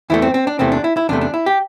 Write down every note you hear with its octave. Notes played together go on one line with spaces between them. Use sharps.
E2 E3 A3 E4
C4
C4
D4
E2 C3 E3 A3 C4
D4
E4
E4
E2 C3 A3 D4
D4
E4
G4